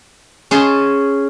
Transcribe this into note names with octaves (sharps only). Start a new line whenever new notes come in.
C#4 G#4 A5 C6